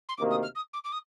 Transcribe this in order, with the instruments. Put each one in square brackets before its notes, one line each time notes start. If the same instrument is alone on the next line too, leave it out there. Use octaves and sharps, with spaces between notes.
[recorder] C6
[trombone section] D2 C3 D#3 A#3 [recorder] D6
[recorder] D#6
F6
D#6
D6
D6
D#6